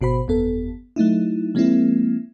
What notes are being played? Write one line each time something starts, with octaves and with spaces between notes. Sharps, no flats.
G#1 B2 F#4 C5 B5
G1 F2 B3 A4
F#3 A3 D#4 E4
F3 G#3 A#3 C4 E4